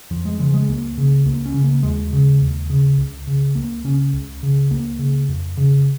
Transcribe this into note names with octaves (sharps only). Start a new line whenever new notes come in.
F2 F3
G#3
C#3 F3
G#3
C#2 A#3
C#3
C#2 A#3
C#4
C#3
A#3
D#2 G#3
C#3
D#2
C#3
C#2
C#3
C#2 A#3
C#3 C#4
C#2
C#3
C#2 A#3
C#3
F2
C#3